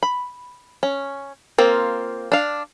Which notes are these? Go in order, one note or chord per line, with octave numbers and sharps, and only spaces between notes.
B5
C#4
A#3 C4 F4
D4 F5